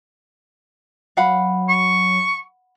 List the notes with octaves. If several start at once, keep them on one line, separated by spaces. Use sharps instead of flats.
F#3 F5 F#5 B5
C#6